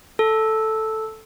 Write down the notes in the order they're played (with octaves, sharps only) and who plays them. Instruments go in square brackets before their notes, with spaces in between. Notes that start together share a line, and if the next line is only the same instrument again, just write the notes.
[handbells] A4